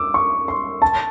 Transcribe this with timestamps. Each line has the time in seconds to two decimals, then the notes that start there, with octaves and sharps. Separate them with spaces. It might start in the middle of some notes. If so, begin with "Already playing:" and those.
Already playing: D6 E6
0.14 C#6
0.48 C6
0.82 A5